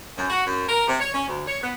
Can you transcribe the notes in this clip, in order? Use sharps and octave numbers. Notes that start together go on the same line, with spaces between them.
F#2
F#4
F#2
A#4
C3
C#5
C#4
D2
C#5
B3